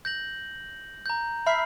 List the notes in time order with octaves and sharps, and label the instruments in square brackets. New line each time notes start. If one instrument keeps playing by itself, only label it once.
[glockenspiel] G6 A#6 F#7
A#5 G6
[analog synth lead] E5 [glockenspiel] B5 F6 C7